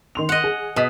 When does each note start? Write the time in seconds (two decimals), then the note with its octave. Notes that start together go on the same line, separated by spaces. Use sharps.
0.15 D#3 C6 F7
0.29 D#5 F#5
0.44 G#4
0.76 B2 D#5 D#6 B6